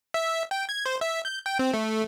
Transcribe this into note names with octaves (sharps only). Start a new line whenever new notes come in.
E5
G5
G#6
C5
E5
G6
G5
C4
A3